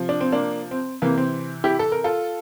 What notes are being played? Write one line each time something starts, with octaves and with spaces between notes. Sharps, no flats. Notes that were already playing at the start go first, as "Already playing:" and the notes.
Already playing: C3 F3
D4
C4
A#3 D4
C4
C3 E3 A#3
C4
E4 G4
A4
A#4
F4 A4